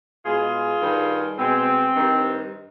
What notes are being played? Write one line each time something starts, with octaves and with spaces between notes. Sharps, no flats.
B2 G#3 F4 G#4
G2 D#3 G3
B2 G#3 C4
G2 D#3 G3